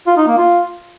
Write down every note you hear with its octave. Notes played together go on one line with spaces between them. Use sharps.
F4
D#4
A#3
F4